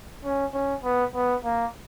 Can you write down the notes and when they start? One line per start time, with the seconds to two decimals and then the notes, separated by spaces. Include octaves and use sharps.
0.24 C#4
0.53 C#4
0.84 B3
1.14 B3
1.45 A#3